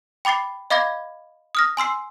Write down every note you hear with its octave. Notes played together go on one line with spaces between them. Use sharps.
G5 B5 D6 A6 C7
D#5 F5 B5 D6 G#6 A#6
D#6 F6 A#6
G#5 C6 E6 C7